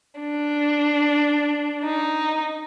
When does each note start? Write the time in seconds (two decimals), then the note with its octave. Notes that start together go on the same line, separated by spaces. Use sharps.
0.21 D4
1.84 D#4